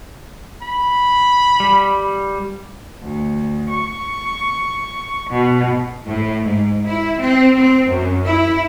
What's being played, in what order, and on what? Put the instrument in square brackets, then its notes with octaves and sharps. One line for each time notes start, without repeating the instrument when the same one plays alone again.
[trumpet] B5
[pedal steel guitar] G3
[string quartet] D2
C#6
B2
[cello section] A2
G#2
E4
C4
C4
F#2
E4